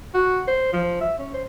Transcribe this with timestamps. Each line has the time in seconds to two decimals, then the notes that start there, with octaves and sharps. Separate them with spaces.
0.14 F#4
0.48 C5
0.73 F3
1.01 E5
1.19 C#4
1.33 C5